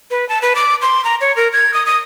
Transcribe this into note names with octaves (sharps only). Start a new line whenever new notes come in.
B4
A5
B4
D6
C6
A#5
C#5
A#4
G#6
D#6
D#6